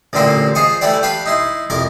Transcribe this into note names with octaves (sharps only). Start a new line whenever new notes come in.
A1 A#2 D3 A#3 G4 C5
F4 G#4 C5 D#5 C#6
E3 G3 A3 E4 G4 D5
G4 B4 F5 A5
D#4 E4 C6
C2 F2 A#4 D6